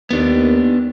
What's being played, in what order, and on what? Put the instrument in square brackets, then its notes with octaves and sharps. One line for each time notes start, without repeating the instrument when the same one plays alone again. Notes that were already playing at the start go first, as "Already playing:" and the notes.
[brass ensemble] D#2 [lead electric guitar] B3 D4